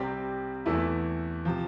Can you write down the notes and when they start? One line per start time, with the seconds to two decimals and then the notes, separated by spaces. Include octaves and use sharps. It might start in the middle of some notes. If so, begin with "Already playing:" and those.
Already playing: C2 C3 G3 C4 G4
0.66 E2 E3 A3 E4
1.45 C3 F3